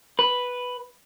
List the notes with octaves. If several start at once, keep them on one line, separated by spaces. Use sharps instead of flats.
B4